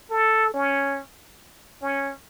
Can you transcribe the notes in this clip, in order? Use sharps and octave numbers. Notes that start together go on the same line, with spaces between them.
A4
C#4
C#4